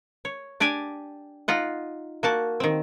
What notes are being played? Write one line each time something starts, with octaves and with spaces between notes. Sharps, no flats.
C#5
D4 G4 D5 G#5
D#4 F4 F#5
A#3 F#4 A5
D#3 C4